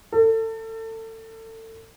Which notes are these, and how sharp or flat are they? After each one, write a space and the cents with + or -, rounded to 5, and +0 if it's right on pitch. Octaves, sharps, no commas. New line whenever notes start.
A4 +30